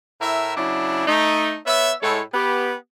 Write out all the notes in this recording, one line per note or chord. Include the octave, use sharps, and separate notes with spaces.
A2 E4 A#4 E5
C#3 F#3 D4 E4
A3 D#4
B3 C#5 E5
A2 G#3 E4 A4 C#5
B3 G4